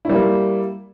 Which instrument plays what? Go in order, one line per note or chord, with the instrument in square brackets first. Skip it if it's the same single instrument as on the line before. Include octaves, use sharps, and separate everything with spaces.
[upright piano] E4
G3
A#3